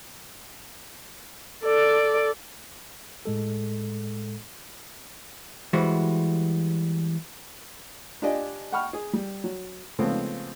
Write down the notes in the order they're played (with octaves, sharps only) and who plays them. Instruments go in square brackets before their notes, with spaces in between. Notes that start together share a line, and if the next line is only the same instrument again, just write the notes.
[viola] A4 D5
[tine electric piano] A2 G#3 A4
[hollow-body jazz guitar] E3 G3 G#3 F#4 C5
[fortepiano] D4 F4 G4 D5 D#5 G#5
F#5 G5 B5 C#6 F6
G#4
G3
F#3
C#3 F3 G#3 A3 B3 C4